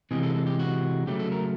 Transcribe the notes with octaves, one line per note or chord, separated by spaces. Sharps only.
C3 E3 G#3 G#4
A4
A4
G4
F#4
C#3 F#3 A3 G4
A4
A#4